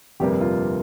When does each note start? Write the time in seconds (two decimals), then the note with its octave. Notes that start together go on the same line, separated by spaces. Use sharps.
0.20 G1 F2 C3 G3 A#3 G4
0.41 F4